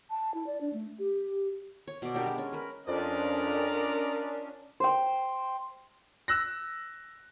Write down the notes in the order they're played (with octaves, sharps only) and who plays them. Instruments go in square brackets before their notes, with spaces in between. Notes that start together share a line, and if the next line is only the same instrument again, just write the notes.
[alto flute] A5
E4
D5
D4
A3
[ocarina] G4
[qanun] C#5
B2 D5
B3 D4 G4 A#4
G#3
C#4
A#4 B4
[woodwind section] F2 [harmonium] C#4 D4 [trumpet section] F4 D5 D#5 [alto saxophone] A#4
[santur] C5 G5
[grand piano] E6 F#6 A#6